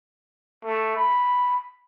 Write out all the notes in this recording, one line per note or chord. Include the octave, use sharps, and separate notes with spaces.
A3
B5